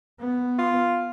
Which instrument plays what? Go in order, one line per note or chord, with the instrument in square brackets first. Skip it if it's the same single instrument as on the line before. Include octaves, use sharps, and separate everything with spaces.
[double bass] B3
[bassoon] F4